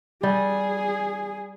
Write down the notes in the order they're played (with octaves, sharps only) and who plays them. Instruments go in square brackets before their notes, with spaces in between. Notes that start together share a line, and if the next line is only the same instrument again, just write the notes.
[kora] G3 [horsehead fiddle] G#4